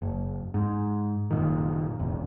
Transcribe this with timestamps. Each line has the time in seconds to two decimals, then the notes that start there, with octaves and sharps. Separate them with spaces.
0.02 F#1
0.54 G#2
1.31 F#1 A#2 D#3
1.99 E1 A1